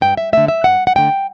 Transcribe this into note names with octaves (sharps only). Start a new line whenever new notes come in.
G2 G5
E5
D3 A3 E5
E5
G2 F#5
F#5
D3 A3 G5